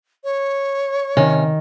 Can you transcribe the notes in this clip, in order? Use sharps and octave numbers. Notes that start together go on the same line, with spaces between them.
C#5
C3 D#3 C#4